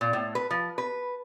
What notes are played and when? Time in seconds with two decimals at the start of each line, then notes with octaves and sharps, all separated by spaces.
0.01 A#2
0.13 A2
0.35 B4
0.50 F3
0.78 B4